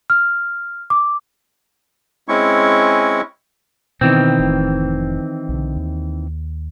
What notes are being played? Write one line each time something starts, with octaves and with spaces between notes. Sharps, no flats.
F6
D6
G#3 C4 C#4 E4 C#6
B2 D#3 E3 B3 C4
F1 F2 A2
B1 D3
D#2